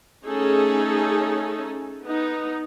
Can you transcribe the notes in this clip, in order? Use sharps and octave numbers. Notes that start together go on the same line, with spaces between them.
A3 C#4 D#4 G#4 A4
B3 D#4